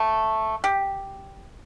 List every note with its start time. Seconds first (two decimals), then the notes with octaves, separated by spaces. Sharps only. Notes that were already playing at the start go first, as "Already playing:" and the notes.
Already playing: A3
0.64 G4